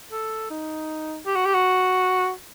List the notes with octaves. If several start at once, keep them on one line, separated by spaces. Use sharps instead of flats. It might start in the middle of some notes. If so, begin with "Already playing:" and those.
A4
D#4
G4
F#4
G4
F#4